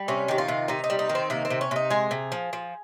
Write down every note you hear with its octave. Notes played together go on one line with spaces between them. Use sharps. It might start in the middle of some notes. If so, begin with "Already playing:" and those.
Already playing: G3
C3 C#4
D#3 G4
F4
C3
C3 D#4
D#4
G3
D#4
D#3
C4
C3 A#3
C4
C3
C#4
C3 D#4
G#3 G#4
C3
F3
F3